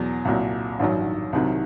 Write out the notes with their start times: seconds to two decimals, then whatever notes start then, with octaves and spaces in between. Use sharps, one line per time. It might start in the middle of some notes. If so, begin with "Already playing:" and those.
Already playing: E2 B2 F#3
0.25 C2 A#2 F#3
0.80 A1 G2 D#3 F#3
1.33 C2 C3 D#3 F#3